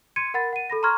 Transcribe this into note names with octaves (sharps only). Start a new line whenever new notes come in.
C6 G#6 C#7 D#7
A#4 F#5 B5 A6
F#5 D#7
A4 B5 A#6
A#5 C6 C#6 F6 G#6